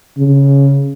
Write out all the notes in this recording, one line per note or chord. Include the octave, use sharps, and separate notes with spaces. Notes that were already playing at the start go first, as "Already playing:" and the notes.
C#3